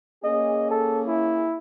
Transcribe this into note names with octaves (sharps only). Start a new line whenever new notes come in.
A#3 C#4 G#4 D#5
A4
E4